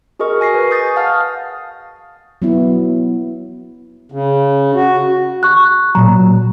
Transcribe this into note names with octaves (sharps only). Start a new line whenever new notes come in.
F#4 G#4 A#4 D#5 C#6 F6
A#4 G#5 A#6 C7
B4
C#6 D#6 G6 A6
F5 F#5 A5 D#6 F6
F#3 B3 E4
C#3
F#4
C#6 F#6
A#2 F#3 A#5